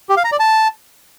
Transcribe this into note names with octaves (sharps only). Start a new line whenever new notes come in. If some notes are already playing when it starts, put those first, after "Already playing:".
G4
F5
A#5
D5
A5